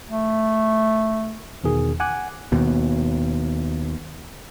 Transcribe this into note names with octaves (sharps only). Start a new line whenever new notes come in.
A3
E2 B2 D#3 G#4
F#5 G#5 D6 F#6
D#2 B2